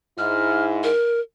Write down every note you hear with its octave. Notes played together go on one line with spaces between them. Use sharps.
G#2 E4 F6
A#4